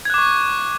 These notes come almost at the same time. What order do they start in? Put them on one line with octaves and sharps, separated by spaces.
G#6 F#6 D6 C#6